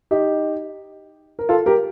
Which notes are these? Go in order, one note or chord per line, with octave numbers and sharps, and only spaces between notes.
D#4 G4
A#4
F4 A4
G4 A#4